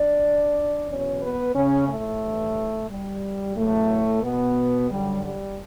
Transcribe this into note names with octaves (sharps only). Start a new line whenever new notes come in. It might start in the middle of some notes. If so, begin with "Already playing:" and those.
Already playing: D4 D5
E2 B2 F#3 C#4 C#5
B3 B4
C#3 C#4
A2 A3
G2 E3
G3
E2 A2 C#3 F#3 A3
B2 B3
F#2 D3 F#3 G3
G3